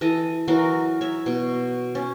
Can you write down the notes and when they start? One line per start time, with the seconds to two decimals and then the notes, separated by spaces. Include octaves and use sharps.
0.01 E3 A4 D#5
0.48 E3 F#3 F#4 A#4
1.01 C#5 E5
1.26 B2
1.95 C#4